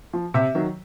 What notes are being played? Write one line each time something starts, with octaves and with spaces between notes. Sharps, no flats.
F3
C3 E5
D#3 F#3